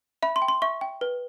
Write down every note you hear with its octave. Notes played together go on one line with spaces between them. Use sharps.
E5 B5
C6
G5
C6
E5 C#6
G5
B4